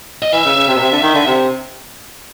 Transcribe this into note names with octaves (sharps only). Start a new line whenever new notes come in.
D#5
E3 E5
C#3
C#3
C3
B2
C3
D3
D#3
D3
C3